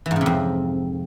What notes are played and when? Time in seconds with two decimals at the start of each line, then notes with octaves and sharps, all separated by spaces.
0.06 E3
0.11 G#2
0.16 C#3
0.21 C3
0.26 F2